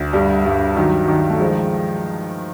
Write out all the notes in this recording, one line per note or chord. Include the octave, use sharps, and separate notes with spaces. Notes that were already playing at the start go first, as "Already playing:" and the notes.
Already playing: D2
G2 G3
G2
D#3 F#3
D#3
A3
F3 G#3